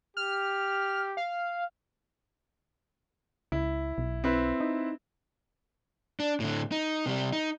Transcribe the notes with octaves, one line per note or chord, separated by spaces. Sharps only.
G4 F6
F5
C#2 E4
B1
C4 E4 B4
D#4
D4
A2 D3
D#4
C3 G3
D#4